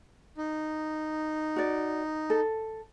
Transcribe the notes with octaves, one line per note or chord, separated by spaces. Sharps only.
D#4
F#4 D5
A4